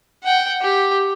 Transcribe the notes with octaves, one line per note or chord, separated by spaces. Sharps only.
F#5 G5
G4